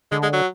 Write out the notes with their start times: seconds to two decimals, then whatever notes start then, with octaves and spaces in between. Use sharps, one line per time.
0.12 D3 G#3
0.23 G#3
0.33 F#3